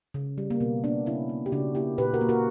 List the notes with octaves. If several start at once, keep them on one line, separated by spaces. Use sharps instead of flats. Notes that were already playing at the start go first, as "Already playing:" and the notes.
C#3
G3
A#3
B2 B3
A#3 B3 D4
C#3 C#4 E4
A#3
G4
C#3 D4 F#4
A#3 E4 G4
A#2 G4 B4
F#4 A#4
A#3
F#4 A#4